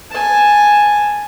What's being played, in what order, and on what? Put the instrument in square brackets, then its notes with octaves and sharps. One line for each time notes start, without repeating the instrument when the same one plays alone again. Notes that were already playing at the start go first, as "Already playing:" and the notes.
[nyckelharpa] G#5 A5